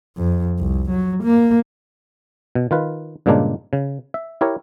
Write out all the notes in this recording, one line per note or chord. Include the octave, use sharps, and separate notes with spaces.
F2
C2
F#3
A#3
B2
D#3 F4 B4
G2 A#2 C#3 G#3 A#3 D4
C#3
E5
E4 G4 A#4 C#5